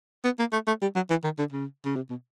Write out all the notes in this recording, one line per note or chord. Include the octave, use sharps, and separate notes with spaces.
B3
A#3
A3
A3
G3
F#3
E3
D#3
D3
C#3
C#3
C3
B2